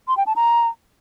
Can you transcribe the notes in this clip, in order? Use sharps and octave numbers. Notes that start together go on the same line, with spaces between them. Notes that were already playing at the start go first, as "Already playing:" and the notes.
C6
G5
A5
A#5